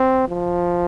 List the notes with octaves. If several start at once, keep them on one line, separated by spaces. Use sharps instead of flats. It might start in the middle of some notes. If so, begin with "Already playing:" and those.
Already playing: C4
F3